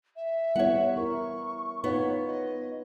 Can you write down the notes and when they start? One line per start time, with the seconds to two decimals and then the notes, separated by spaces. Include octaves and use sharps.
0.16 E5
0.56 G3 B3 E4 C#5 F#5
0.96 E4 A#4 C#6
1.84 B3 D#4 F4 C#5
2.26 D#5